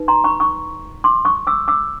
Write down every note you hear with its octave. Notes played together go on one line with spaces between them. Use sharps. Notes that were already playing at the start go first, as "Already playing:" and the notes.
Already playing: D#4 B4
A#5 C6
B5 C#6
C#6 D#6
C6 D6
C#6 D#6
D6 E6
D6 E6